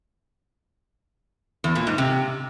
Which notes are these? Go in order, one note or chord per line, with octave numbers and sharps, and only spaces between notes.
E2
A#2
G#2
C3